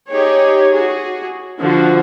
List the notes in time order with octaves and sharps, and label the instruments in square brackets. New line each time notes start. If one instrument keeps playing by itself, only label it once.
[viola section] D#4 G4 G#4 C#5
F#4 G#4
D3 F3 F#4